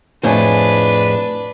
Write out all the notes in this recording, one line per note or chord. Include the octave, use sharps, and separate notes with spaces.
F2 A2 D4 G#4 B4